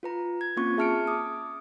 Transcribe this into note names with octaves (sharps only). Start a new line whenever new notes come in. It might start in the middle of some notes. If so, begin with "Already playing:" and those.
F4 B4 A#5
G#6
A#3 C4 C#4 F4 C#6
G#4 E5 A5 F6 C#7 D7
D6 D#6